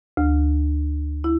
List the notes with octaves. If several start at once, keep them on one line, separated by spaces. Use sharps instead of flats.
D2
E4